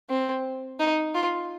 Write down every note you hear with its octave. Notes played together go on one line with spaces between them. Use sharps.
C4
D#4
F4